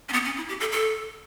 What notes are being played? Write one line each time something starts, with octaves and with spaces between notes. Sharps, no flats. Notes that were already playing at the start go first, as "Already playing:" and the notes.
C#4
B3
C#4
E4
G4
A4
A4